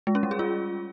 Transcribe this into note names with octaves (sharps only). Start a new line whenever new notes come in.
G#3
C#4
G3
G#4
F4